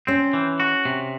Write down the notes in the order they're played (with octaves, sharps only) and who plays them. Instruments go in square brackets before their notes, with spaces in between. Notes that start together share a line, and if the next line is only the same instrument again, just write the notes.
[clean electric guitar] C4 [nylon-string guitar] C#4
[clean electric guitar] E3
F#4
C3